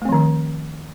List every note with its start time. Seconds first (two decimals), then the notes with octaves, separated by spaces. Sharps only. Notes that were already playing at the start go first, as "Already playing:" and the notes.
0.02 A3
0.05 C4
0.09 F3
0.12 D#3